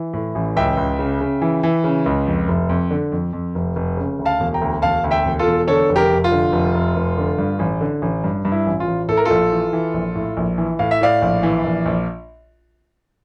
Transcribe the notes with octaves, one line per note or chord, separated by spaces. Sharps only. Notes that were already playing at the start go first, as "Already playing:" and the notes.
Already playing: E3
A2
A1
C#2 E5 G5
C#2
C#3
C#3
E3
E3
C#3
C#2
F2
F1
F2
D3
F2
F2
F1
F1
C#3
D2
F5 A5
E1
G5 A#5
D2
E1 F5 A5
D2
E5 G5
E1
F4 A4
E1
D3 A4 C#5
F1
G4 A#4
F1
F4
D3
F1
F1
F1
D3
G2
A1
D3
A1
G2
G2
E4
A1
F4
A1
A2 A4
A#4
A#1 F4 A4
E3
E3
A#1
A2
A#1
E3
A2 F5
E5
A2 D5 F5
A#1
E3
A#1
A#1